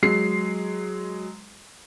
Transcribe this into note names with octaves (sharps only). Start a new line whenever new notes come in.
F#3 G#3 C7